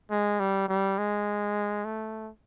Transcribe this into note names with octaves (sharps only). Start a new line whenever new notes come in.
G#3
G3
G3
G#3
A3